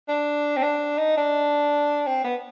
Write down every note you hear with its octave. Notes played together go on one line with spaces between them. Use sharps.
D4
C4
D4
D#4
D4
C4
B3